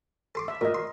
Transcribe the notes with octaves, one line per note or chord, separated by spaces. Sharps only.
A4 C6 D6
E5
A#2 A#4 D#5
C6